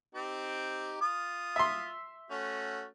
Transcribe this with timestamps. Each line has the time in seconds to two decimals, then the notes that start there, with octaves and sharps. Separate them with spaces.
0.14 C4 D#4 G4
1.01 F4 D#6
1.56 E5 C6
2.31 A3 C#4 F#4